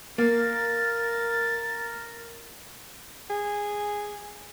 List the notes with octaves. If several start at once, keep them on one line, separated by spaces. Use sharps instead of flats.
A#3 A#4 A6
G#4